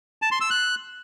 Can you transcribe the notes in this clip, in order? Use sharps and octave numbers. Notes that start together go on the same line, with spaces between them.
A5
C6
E6
F#6